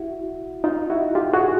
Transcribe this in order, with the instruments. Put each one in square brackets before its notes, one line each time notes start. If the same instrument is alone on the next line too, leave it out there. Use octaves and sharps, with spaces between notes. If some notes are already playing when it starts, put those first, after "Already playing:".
Already playing: [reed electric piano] E4 F#4
D#4 F4
E4 F#4
F4 G4
F#4 G#4